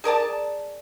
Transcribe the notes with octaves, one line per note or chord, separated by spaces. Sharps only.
G#4 A#4 D5 A5